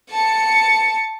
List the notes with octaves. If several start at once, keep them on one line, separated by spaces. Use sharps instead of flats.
A5 C#7